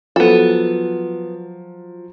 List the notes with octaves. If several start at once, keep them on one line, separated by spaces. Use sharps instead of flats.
F3 F#3 B3 A4